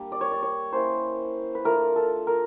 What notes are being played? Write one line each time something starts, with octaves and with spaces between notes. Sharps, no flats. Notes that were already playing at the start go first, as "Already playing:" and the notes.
Already playing: G3 A#3 D4
D5
C#5
D5
C#5
A#3 C#4 E4 C5
B4
A3 D4 F4 A#4
A4
A#4